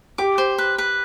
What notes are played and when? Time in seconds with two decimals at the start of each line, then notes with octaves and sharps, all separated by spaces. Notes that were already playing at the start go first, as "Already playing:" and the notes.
0.18 G4 D6
0.38 C5
0.58 B4
0.78 B4